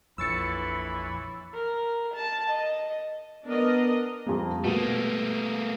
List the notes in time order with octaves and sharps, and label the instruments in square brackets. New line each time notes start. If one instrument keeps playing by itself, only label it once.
[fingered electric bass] A#1 F2 [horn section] E3 C#5 B5 [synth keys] E6 A6 C#7
[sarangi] A#4
A5
D#5
[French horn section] B3 [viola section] D4 A#4 D#5
[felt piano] F2 G3 A#3
[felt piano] B2 G3 D#7 [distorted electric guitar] A3 A#3